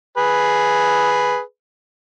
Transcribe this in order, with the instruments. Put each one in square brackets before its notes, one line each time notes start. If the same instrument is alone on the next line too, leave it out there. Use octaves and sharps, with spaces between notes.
[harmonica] G#4 B4